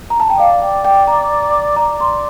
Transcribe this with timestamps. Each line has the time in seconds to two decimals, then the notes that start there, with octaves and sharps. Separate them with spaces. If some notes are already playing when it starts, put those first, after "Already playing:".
0.10 A#5
0.20 A5
0.30 G5
0.39 D5 F5
0.62 G5
0.85 G5
1.07 A#5
1.76 D5 A#5
2.00 C6